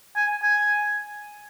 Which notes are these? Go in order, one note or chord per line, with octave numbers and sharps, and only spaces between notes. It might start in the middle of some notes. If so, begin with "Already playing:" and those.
G#5
G#5